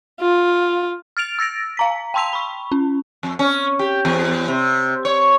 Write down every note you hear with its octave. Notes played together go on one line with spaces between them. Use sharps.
F4
F6 A6 D7 F7
E6 A6 A#6 D7
F5 A#5 B6
G5 A5 C6 E6 B6 F7
B5 C#6
C#4
F2
C#4
G4
E2
C3
C#5